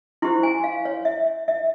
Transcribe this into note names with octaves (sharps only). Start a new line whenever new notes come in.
E4 G4 C5 C6
G#5
F5
C#5
E5
E5